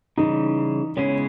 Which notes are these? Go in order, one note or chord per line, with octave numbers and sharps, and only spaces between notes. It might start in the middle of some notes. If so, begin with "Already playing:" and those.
C#3 E3 G3 D#4
C#3 G#3 B3 C#4 E4 G#4